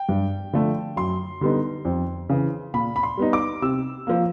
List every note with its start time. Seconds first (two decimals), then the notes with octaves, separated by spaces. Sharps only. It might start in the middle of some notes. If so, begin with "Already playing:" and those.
Already playing: G5
0.09 G2
0.53 D3 F3 A3
0.97 F#2 C6
1.41 D3 G3 B3 D#4
1.85 F2
2.29 C#3 E3
2.74 A#2 B5
2.96 B5
3.03 C6
3.17 G3 B3 D#4
3.33 D6
3.62 C3 E6
4.07 F3 A#3